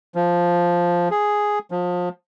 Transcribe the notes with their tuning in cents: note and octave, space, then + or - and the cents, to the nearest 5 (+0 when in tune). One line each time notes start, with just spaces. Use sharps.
F3 +0
G#4 +0
F3 +30